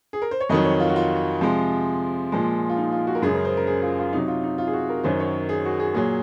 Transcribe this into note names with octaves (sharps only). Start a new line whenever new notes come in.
G#4
A#4
C5
C#5
F2 D#3 F#3 D#5
C#5
F4
F#4
F4
C3 F3 G#3
A#2 F3 G#3
F4
D#4
F4
F#4
A#4
F#2 C#3 G#3 G#4
A#4
C5
A#4
G#4
F4
F4
C3 F#3 D#4
F4
D#4
F4
G#4
F#4
A#4
F#2 D#3 F#3 C5
C#5
G#4
F#4
G#4
A#2 F#3 G#4